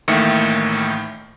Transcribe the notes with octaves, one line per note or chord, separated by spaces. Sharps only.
A1 A2 D#3 A#3 E5 C#7